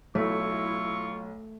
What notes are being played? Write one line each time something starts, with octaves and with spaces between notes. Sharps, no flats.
B1 A3 E4 F4 C#6 E6